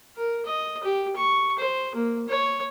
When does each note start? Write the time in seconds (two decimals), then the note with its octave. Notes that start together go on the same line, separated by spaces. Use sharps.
0.16 A#4
0.46 D#5
0.84 G4
1.16 C#6
1.59 C5
1.95 A#3
2.28 C#5